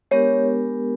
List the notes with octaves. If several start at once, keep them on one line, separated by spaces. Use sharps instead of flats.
G#3 B3 D4 G4 A#4 C#5